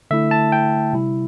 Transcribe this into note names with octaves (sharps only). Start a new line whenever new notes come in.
D3 A3 E4 E5
A5
G5
C3 G3 E4